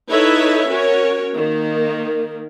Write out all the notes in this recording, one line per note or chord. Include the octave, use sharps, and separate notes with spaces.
D#4 E4 A4 B4 C#5 E5
C#4 F#4 A#4 C#5
D#3 A#3